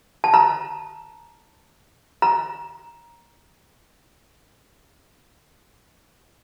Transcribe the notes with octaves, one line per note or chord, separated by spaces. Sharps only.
A5
A#5
A#5